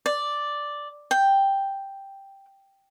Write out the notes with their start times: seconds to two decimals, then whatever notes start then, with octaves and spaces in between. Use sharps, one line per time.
0.06 D5
1.11 G5